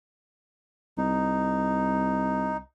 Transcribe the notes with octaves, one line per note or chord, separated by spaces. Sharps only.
C2 D#4